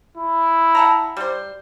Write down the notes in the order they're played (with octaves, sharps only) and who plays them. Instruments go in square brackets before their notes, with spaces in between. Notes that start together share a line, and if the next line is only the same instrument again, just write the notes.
[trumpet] E4
[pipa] F#5 A5 A#5
G3 C5